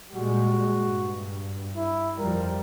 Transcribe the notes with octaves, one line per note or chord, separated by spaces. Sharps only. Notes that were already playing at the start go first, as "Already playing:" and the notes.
A#2 G3 G#3 F#4
G2
E4
F2 F3 G3 A#4